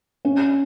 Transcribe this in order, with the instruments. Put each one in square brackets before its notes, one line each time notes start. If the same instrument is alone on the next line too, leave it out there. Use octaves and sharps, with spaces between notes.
[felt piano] C#4